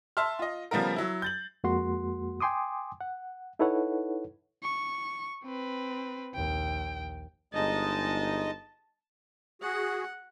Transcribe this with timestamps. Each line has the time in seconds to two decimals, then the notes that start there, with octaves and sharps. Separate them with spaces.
0.17 E5 A5 C6 F6
0.39 F4 D#5
0.71 C#3 F3 G3 B3 F4 A#4
0.96 F#3 E4
1.22 G6 A6 F#7
1.64 F2 G#3 A#3 F#4 F#5 C6
2.41 G5 G#5 C6 D6 D#6
3.01 F#5
3.59 D#4 E4 A4 B4 C#5 F#5
4.63 C#6
5.44 C4 B4
6.35 A#1 D#2 G5
7.54 G1 G#3 D#4 D#5 A5
9.61 F#4 G#4 F#5